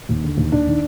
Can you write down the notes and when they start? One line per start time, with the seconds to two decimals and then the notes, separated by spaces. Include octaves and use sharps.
0.09 D#2
0.24 D3
0.37 D#2
0.52 D#2 D4
0.67 D#3